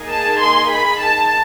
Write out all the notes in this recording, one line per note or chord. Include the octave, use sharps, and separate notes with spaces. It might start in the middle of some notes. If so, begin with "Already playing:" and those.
Already playing: A#3 D#4 G#4
A5
C6
B5
A5